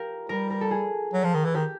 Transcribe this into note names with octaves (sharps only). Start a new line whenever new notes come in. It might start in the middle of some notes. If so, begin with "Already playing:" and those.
Already playing: F4 G4 A#4
G3 A#4
A#4
A4
G#4
F#3
F3
D#3
E3
D#3 G4